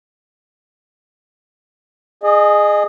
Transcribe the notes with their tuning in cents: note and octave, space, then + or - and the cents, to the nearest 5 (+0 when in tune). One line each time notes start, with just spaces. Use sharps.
G#4 +0 D#5 -30